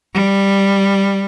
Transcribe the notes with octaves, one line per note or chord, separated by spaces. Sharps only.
G3